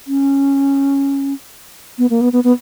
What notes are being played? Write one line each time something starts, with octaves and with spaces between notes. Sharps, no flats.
C#4
B3
A#3
B3
B3
B3